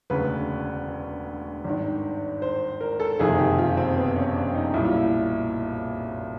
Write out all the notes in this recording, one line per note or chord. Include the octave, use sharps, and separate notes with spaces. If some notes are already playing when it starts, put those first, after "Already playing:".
E1 D2 C#3 B4
G#1 G2 D#3
C5
A#4
A4
F#1 F2 C3 D#3 G#4
G4
F4
C4
B3
C#4
D4
D#4
B1 A#2 G3 E4
F4
E4